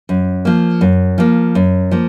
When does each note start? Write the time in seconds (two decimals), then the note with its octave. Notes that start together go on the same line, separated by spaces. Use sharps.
0.09 F#2
0.45 F3 A#3
0.81 F#2
1.18 F3 A#3
1.55 F#2
1.91 F3 A#3